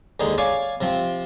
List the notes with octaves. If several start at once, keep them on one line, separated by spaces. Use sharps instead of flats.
D#2 D3 G#3 D#4
C#5 D5 F5 G#5
C3 F3 C4